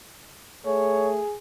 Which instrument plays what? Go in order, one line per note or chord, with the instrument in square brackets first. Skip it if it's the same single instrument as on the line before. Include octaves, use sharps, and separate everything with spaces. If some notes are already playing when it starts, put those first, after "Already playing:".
[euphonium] A3 [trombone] G#4 [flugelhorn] C#5